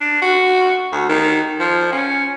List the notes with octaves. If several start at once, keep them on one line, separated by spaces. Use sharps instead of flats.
D4
F#4
D2
D#3
F3
C#4